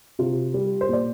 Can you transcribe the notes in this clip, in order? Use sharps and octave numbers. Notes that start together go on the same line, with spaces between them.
C3 F4
G3
C5
A#2 D5